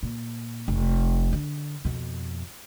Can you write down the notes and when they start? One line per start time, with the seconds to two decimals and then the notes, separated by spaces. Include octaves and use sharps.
0.03 A#2
0.68 F1
1.33 D3
1.85 F2 B2